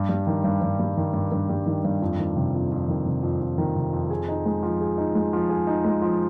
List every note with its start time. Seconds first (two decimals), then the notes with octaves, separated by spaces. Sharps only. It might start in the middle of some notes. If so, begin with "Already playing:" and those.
Already playing: G2
0.09 G3
0.27 D#3
0.44 G2
0.61 G2
0.79 G3
0.97 D#3
1.14 G2
1.32 G2
1.49 G3
1.66 D#3
1.84 G2
2.02 F2
2.19 D#3
2.37 C3
2.54 F2
2.72 F2
2.88 D#3
3.06 C3
3.23 F2
3.41 F2
3.58 D#3
3.76 C3
3.93 F2
4.10 G#4
4.28 D#4
4.46 G#3
4.63 F3
4.81 G#4
4.98 D#4
5.15 G#3
5.33 F3
5.49 G#4
5.67 D#4
5.85 G#3
6.02 F3